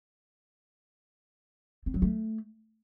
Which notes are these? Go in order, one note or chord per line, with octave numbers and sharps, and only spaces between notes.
C4
F#3
A3